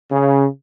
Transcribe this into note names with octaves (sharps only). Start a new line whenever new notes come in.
C#3